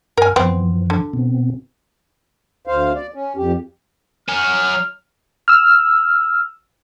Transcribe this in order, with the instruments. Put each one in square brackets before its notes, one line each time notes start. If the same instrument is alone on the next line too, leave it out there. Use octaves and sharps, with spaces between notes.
[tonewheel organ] G2 F#5 F6 [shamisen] A#4 G#5
[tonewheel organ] F#2 E3 F3 [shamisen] B3 C4
[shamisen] D3
[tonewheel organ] B2 B3 C4
[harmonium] D2 C5 F5
D5
C#4
F2 G4
[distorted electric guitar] F#3 G#5 [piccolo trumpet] F6
[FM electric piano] E6 F6